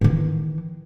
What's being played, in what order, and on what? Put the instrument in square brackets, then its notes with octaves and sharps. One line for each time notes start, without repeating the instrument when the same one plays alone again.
[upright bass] D#3 E3